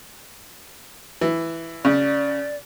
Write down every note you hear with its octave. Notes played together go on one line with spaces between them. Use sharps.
E3
C#3 D5